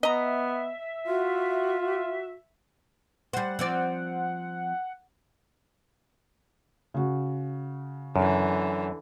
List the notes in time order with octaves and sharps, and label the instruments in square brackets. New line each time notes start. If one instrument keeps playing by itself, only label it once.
[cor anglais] B3 [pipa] D#5 A#5 [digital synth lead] E5
[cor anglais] F4 [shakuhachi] F#4
[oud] G3 C5 [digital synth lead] F#5
[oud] F3 C4 D5
[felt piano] C#3 F#4
[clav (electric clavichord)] F#2 [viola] D3 E3